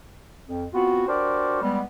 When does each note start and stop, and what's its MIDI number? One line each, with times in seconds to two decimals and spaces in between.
0.47 0.65 41
0.74 1.07 59
0.74 1.07 60
0.74 1.07 65
0.74 1.07 66
1.08 1.60 62
1.08 1.60 66
1.08 1.60 67
1.08 1.60 70
1.08 1.60 72
1.08 1.60 74
1.62 1.82 55
1.62 1.82 56
1.62 1.82 59